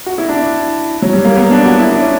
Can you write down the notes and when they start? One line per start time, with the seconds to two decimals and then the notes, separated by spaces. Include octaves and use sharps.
0.06 F#4
0.18 E4
0.29 D4
1.02 F#3
1.13 G3
1.25 A#3
1.36 B3
1.51 D4
1.65 F#4
1.79 E4
1.91 D4
2.01 C#4